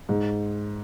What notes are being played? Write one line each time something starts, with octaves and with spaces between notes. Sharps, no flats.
G#2